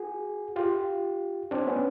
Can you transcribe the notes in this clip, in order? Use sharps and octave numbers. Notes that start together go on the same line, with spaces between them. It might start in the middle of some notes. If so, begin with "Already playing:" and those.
Already playing: F#4 G#4
F4 G4
C4 D4
B3 C#4